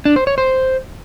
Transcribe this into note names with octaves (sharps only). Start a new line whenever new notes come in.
D4
C5
C#5
C5